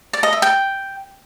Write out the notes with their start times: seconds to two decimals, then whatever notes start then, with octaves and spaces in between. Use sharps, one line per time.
0.13 D5
0.23 D#5
0.33 E5
0.42 G5